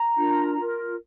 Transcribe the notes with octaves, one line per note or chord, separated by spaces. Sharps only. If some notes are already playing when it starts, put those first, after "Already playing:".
Already playing: A#5
D4 F4 A#4
F4 A#4